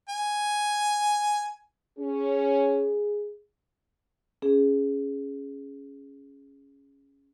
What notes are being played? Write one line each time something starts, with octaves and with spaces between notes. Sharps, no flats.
G#5
C#4 G#4
C#4 G#4